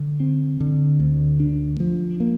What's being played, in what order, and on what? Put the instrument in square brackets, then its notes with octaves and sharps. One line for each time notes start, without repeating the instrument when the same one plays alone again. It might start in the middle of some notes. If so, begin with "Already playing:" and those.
Already playing: [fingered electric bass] D3
C4
D3
D2
D4
F3
A#3